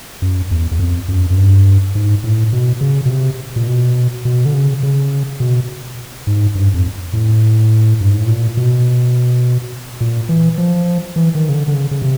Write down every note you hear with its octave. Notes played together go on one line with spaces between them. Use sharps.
F#2
E2
E2
F2
F#2
F#2
G2
G#2
A2
B2
C#3
B2
C3
A#2
B2
B2
D3
C#3
C#3
B2
G#2
G2
F2
A2
G2
G#2
A2
A#2
B2
A#2
E3
F3
E3
D#3
C#3
D3
D3
C#3
C#3
C3